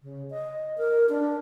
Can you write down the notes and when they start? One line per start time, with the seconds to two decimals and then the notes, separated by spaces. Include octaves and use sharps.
0.03 C#3
0.30 D#5
0.78 A#4
1.09 D4